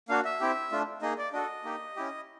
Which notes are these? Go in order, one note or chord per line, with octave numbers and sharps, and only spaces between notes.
A#3 D4 F#4 F5
E5
C4 E4 G4
A3 D4 F4
A#3 D#4 G#4 D#5
D5
D4 F#4 A4 D#5
A#3 D#4 G4
C#4 E4 G4